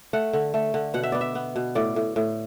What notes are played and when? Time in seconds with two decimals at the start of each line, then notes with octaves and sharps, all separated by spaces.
0.13 A3 F#5
0.33 D3
0.54 A3
0.74 D3
0.94 B2 F#5
1.03 E5
1.12 B3 D5
1.21 E5
1.35 B3
1.56 B2
1.75 A2 D5
1.96 A2
2.16 A2